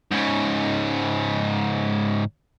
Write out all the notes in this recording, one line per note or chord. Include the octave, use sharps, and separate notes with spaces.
G#2 C#3